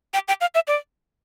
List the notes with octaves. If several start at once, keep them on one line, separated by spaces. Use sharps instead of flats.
G5
G5
F5
E5
D5